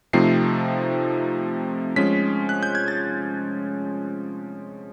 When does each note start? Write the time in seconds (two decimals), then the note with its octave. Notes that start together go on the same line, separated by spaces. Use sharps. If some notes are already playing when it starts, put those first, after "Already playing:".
0.13 C3 F3 A3 C4 D#4 C7
1.96 F3 G#3 C#4 B6
2.49 F#6
2.63 G6
2.75 G#6
2.88 A6